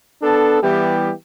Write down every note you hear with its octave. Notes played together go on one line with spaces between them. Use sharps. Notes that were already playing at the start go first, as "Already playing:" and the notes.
B3 D4 A4
E3 G3 B3 E4 G4